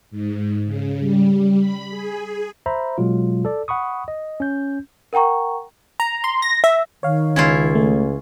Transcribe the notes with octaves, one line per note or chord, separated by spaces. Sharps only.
G#2
C#3
G3
B5
G#4
C5 E5 A#5 B5
B2 F#3 G#3 F4
A4 D5
F#5 B5 C#6 D#6
D#5
C#4 G6
A#4 F#5 G5 A#5 C#6
A#5
C6
A#6
E5
D#3 C#5 F5
C#2 C#4 E4 F4
A3